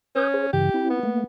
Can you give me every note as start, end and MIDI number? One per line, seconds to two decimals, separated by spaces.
0.15 0.50 61
0.15 0.28 71
0.15 0.28 87
0.15 0.28 91
0.34 0.47 68
0.34 0.47 72
0.53 0.69 43
0.53 0.69 49
0.53 0.69 52
0.53 0.88 67
0.74 1.00 60
0.74 1.00 64
0.90 1.23 59
1.03 1.24 57
1.03 1.24 58